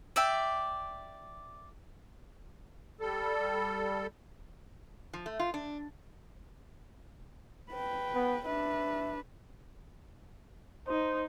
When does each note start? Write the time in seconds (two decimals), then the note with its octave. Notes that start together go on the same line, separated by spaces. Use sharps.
0.16 D5 E5 G5
3.00 G3 A4
5.13 F3
5.26 A3
5.39 F4
5.54 D4
7.72 B4 G5
8.15 B3
8.46 D4 B4 E5
10.88 D#4 C5